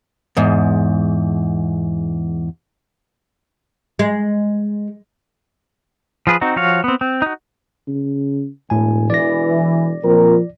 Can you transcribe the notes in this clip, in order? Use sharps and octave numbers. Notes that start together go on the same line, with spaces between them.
E2 G#2
G#3
F3 F4 G#4 B4
C4 D#4 F#4
F3 F#4 C#5 F5
B3 C4
C4
D#4 F#4
C#3
E1 A2 G#5
E3 D5 A#6
A#2 F3 C4 A#4